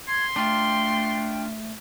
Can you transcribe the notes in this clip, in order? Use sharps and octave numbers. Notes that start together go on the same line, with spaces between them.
C6 G#6
A3 D4 F4 G5